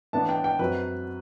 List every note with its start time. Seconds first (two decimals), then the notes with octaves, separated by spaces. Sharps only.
0.13 A2 E3 B3 D4 A5
0.29 G5
0.44 G5
0.59 F#2 F#3 C4 B4